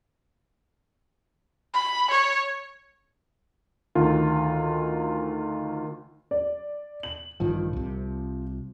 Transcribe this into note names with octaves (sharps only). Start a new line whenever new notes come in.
B5
C#5
D2 D#3 F4
D5
F#7
A1 G2 D#3 F3
C2 C3